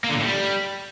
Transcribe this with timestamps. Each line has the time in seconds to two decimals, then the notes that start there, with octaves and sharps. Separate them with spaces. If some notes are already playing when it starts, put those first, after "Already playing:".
0.04 A#3
0.09 D3
0.15 A#2
0.20 A2
0.25 G3